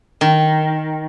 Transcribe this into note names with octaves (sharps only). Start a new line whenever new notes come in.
D#3